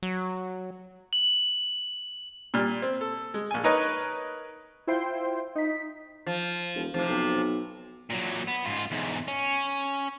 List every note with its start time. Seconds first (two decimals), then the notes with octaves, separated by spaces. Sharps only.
0.03 F#3
1.13 F#7
2.54 A#2 G3 F6
2.82 C4
3.01 A4
3.34 G#3
3.51 A#1 G#5
3.64 D#4 A#4 B4 C#5 D#5
4.87 E4 F4 C5 G5 C6
5.55 D#4 B6
6.26 F3
6.76 E1
6.94 F1 C3 F3
7.09 B1
8.10 A#2 F#3
8.47 B3
8.65 G#2 F4
8.91 E2 G#2
9.28 C#4